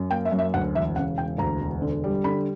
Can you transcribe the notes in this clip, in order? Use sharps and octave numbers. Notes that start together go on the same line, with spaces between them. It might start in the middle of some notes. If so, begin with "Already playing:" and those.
Already playing: F#2
A#3 G5
E5
F#2
E5
D2 F#5
E1 E5
C#3 F#5
E1 G5
D2 A#5
E1
D3
G3
D3 B5